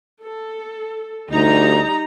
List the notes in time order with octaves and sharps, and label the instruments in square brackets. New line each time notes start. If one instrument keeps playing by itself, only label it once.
[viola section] A4
[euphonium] D2 [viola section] G3 D#4 A#5